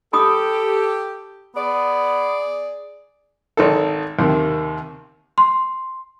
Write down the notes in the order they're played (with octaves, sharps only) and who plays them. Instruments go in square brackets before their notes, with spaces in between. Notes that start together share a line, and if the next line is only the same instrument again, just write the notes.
[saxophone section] G4 [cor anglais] A4 [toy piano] B5 D#6
[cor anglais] B3 [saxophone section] G#4 D5
[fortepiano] G#1 D#4 A4
D#2 C3 D#3
[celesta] C6